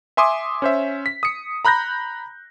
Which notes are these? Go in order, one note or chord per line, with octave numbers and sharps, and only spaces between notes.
E5 G#5 C6 D6 D#6
C#4 C5 E5
B6
D#6 C#7
A#5 B5 F#6 G6 A#6